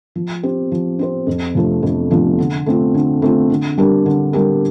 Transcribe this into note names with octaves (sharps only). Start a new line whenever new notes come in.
F3
C4 G4 C5
F3
C4 G4 C5
F2
C3 F3 A3 D4
F2
C3 F3 A3 D4
D3
A3 C4 F4
D3
A3 C4 F4
D3
G3 D4 G4 A#4
D3
G3 D4 G4 A#4